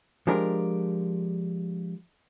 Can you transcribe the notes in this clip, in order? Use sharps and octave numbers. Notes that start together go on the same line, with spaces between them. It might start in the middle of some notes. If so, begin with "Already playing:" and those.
F3 G#3 D4 G4 A#4